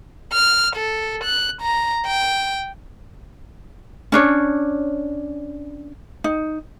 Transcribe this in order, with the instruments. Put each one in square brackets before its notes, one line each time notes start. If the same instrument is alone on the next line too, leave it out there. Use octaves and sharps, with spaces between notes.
[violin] F6
A4
F#6
A#5
G5
[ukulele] C#4 D4 C#5
D#4